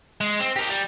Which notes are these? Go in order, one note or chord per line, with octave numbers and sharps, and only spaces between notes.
G#3
C4
G4 A#4
G3